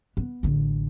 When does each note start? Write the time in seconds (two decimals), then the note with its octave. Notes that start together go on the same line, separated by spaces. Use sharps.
0.17 B3
0.43 A1 D3